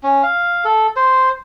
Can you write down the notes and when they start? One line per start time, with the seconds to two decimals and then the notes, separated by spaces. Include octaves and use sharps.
0.03 C#4
0.23 F5
0.65 A4
0.96 C5